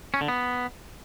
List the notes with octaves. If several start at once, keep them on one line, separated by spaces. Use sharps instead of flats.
C#4
D3
B3